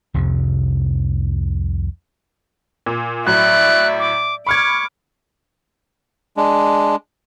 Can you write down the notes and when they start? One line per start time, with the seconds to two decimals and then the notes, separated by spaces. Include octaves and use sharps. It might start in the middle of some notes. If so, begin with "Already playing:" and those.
0.14 C2 F2 C3 F3
2.86 A#2
3.26 A2 F#3 D5 E5 F#6
4.00 D6
4.47 B5 C#6 D6 F6 G#6
6.37 G#3 D4